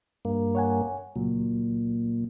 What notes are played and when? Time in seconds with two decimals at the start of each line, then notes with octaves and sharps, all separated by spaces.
0.25 G2 A#3
0.55 C#5 F#5 G#5
1.16 C#2 A#2 F#3